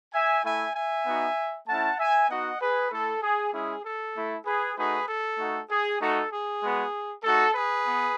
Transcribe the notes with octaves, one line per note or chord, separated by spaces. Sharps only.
E5 G#5
A3 E4 E5 G#5
E5 G#5
B3 D#4 F#4
A3 C#4 E4 F#5 A5
E5 G#5
B3 D#4 F#4 D#5 F#5
G#4 B4
A3 E4 A4
G#4
G#3 C#4 E4 G#4
A4
A3 E4
G#4 B4
A3 D#4 F#4 G#4 B4
A4
A3 D#4 F#4
G#4
A3 D#4 F#4 A4
G#4
G#3 B3 F#4
A3 D#4 F#4 A4
G#4 B4
B3